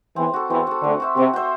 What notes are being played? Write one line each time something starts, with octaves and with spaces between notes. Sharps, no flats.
E2 E3 C4
F#4 A4
E2 E3 C4
F#4 A4
D2 D3 C4
F#4 C5 E5
C3 C4
F#4 C5 E5